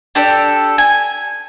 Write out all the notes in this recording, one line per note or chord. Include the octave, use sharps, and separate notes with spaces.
D4 G4 A4 D5
G#5